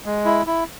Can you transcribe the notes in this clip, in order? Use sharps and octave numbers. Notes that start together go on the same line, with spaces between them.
G#3
E4
E4